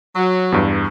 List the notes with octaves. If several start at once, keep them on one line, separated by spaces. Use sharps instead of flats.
F#3
E2 G2